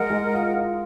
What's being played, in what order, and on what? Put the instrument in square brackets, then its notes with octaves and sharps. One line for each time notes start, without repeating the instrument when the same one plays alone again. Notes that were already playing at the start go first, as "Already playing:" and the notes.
Already playing: [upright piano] G#3 [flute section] A#4 D#5 F#5
[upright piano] G#3
F4
F4